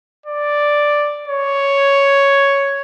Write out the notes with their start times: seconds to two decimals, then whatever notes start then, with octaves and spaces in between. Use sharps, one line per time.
0.26 D5
1.28 C#5